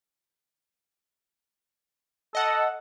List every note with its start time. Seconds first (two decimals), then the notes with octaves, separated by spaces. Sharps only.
2.35 A4 D#5 F#5